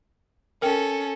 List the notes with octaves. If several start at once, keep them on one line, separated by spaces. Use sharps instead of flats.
C#4 A4 A#4 G5